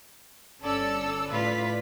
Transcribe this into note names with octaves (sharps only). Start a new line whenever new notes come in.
G1 C#4 A4 D5 E6
A2 F4 B4 D5 B6